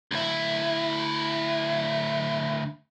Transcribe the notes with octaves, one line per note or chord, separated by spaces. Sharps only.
D2 E4